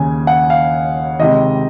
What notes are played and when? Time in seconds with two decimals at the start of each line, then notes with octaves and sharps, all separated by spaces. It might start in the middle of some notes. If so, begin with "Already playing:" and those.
Already playing: D#2 C#3 G#5
0.27 F#5
0.50 F5
1.19 C#2 C3 D#3 D#5